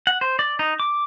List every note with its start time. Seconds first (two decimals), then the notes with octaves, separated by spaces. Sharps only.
0.07 F#5
0.21 C5
0.39 D5
0.59 D#4
0.80 D6